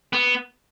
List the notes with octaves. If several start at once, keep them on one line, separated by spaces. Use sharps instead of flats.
B3